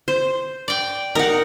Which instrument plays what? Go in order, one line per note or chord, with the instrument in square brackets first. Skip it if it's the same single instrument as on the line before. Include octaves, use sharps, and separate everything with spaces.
[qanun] C5
[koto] D5 G5
[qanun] D#4 F#5 [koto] A#4